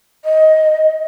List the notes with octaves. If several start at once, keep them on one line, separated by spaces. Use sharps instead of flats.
D#5